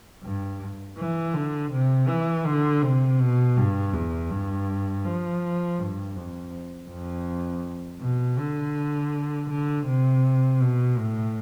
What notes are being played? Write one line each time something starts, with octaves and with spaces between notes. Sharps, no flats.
G2
E3
D3
C3
E3
D3
C3
B2
G2
E2
G2
F3
G2
F2
F2
B2
D3
D3
C3
B2
A2